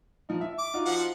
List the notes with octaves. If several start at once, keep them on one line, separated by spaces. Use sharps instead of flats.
F3 D#4
E5
D6
D#4 F4 F#4
F3 F#5